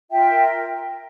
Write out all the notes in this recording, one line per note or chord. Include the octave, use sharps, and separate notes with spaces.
F4 E5 G5
A#4